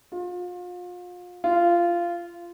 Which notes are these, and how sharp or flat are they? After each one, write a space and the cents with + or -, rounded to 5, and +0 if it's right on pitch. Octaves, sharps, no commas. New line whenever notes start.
F4 +35
F4 -15